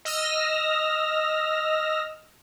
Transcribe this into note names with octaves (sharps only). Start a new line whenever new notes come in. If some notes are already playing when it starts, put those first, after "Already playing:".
D#5 E6 F6 A#6